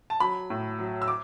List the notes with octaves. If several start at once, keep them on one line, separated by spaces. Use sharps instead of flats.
A5
F#3 B5
A2
F#3
E6
D6